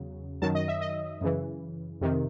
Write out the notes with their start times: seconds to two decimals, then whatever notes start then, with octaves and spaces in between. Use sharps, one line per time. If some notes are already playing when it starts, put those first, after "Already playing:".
Already playing: E2 C#3 F#3
0.42 F#2 D#3 F#3 A5
0.55 D#5
0.68 E5
0.81 D#5
1.21 F#2 C#3 E3
2.01 F2 C3 D#3